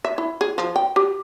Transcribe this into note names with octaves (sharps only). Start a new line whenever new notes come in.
E5
E4
G#4
F3
G5
G4